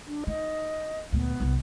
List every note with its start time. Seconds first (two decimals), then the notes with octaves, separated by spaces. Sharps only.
0.07 D4
0.27 D#4 D#5
1.12 D2 A#2 B3
1.40 C2 F#2